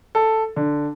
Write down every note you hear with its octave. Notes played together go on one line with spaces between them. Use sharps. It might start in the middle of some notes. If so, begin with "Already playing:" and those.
A4
D3